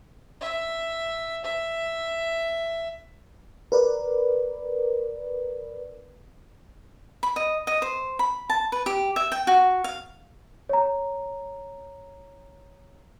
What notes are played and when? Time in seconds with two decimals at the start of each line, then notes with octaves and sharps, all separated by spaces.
0.41 E5
1.44 E5
3.72 A#4 B4 D5
7.23 B5
7.36 D#5
7.67 D#5
7.82 C5
8.19 B5
8.50 A5
8.72 B4
8.86 G4
9.16 E5
9.32 G5
9.47 F#4
9.84 F5
10.69 C#5 A#5